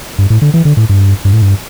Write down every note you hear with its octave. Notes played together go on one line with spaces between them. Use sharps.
G2
A2
D3
E3
D3
A2
G2
G2
A2
G2